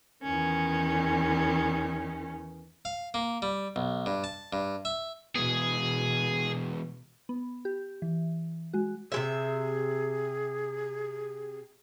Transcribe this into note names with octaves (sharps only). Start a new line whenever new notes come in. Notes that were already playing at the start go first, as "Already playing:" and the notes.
E2 D#3 C#4
F5
A#3
G3
B1
G2
A5
G2
E5
B2 E3 G#3 B3 G#4
B3
G4
E3
G#3 F#4
C3 G#3 G#4 E5